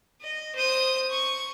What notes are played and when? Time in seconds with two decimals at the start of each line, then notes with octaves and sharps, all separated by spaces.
0.21 D#5
0.56 C5 D#6
1.11 C#6